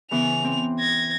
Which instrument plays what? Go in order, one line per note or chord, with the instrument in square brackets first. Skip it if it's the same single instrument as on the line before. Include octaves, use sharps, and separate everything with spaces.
[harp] C#3 E3 B3 [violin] F7
[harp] C4
[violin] G#6 A#6